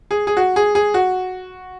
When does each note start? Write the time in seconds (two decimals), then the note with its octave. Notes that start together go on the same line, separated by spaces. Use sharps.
0.11 G#4
0.27 G#4
0.37 F#4
0.56 G#4
0.75 G#4
0.94 F#4